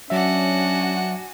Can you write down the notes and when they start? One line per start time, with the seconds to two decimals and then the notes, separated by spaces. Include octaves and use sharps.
0.10 F#3 C#4 D4 F#4 E5 F#5 G#5